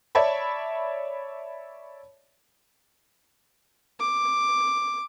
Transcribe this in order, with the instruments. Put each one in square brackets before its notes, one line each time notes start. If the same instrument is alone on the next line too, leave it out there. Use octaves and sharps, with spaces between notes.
[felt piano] C#5 D5 E5 A5 B5
[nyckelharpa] D6